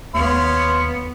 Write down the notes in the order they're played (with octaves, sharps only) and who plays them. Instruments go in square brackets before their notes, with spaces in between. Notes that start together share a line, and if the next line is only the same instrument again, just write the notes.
[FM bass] D#2 [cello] B3 [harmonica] C#5 F5 C6